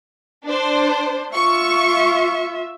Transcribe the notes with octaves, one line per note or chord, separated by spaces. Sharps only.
D4 C5
F4 E5 C#6